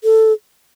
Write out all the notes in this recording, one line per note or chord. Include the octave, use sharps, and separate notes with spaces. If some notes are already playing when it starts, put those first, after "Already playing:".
A4